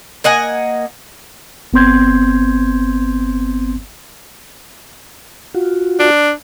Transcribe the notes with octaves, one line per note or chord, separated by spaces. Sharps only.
A#3 D#5 F#5 G#5
G1 B3 C4 C6 G6 G#6
F4 F#4
D4